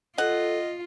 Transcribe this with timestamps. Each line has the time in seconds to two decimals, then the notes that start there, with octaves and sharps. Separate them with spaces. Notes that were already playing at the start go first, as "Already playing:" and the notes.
0.18 F4 A4 D#5 F#5